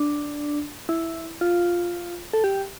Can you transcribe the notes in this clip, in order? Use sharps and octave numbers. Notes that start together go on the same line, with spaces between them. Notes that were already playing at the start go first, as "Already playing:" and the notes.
Already playing: D4
E4
F4
A4
G4